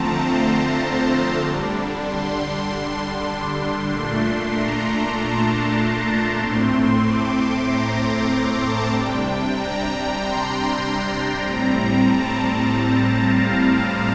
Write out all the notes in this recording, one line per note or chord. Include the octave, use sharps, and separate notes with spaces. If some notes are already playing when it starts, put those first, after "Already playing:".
Already playing: D3 F3 A3 C4 A5 A#5
C6
D3 G3 D4
C6
A#2 A3 D4 C6
A#5
A5
A#5
A2 A3 C4 C6
D6
C6
A#5
C6
A#5
A5
C3 G3 D4 G5
A#5
C6
A2 G3 C4 A#5
A5
F5